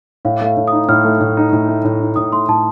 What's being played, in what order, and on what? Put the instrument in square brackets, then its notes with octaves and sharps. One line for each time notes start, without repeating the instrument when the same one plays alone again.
[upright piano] A2 [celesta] F5
[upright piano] A3 [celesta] F5
[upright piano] A2
[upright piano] D#4 [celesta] D#6
[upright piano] A2 [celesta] F6
[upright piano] A3
A2
D#4
A2
A3
A2
D#4
[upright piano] A2 [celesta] D#6
[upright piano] A3 [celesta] C6
[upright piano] A2 [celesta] A5